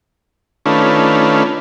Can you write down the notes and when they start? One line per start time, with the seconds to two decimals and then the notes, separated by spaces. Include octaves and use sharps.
0.66 D#3 A3 C#4 D4 F4 B4